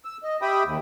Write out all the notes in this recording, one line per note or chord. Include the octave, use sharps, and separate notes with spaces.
E6
D#5
G4 E5 G5 B5 D#6
D#2